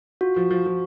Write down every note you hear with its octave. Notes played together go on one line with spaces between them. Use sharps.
F4 F#4
F3
F3
F3